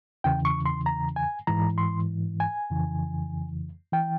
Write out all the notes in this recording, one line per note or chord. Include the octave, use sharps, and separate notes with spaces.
E2 C#3 E3 G5
C#6
C6
A#5
G#5
G#2 E3 A#5
C6
G#5
F2 C#3 E3
E3 G5